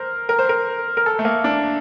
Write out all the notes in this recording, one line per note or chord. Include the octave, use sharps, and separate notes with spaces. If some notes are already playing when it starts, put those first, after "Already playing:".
Already playing: A#4 C5
A#4
C5
A#4
A#4
A4
A3
A#3
D4